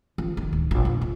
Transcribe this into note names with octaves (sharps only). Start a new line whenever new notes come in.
F3
D#3
D1
A#1
F2
F2